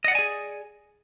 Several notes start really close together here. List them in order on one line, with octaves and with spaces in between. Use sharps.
D#5 F#5 D5 G#5 G#4